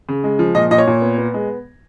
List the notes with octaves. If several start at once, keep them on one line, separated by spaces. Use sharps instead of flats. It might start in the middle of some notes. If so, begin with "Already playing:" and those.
C#3
G#3
F3
A#2 D#5
A#2 D#5
C#5
A#2
B3
B3
G#3